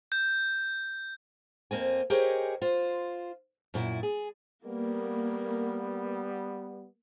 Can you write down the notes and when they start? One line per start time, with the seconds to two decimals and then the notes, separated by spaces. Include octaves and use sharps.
0.12 G6
1.71 F2 A#3 C4 G#5
2.10 G4 G#4 A#4 C5 C#5 D#5
2.62 F4 C5
3.74 F#2 A#2 E4
4.03 G#4
4.65 G3 A#3 B3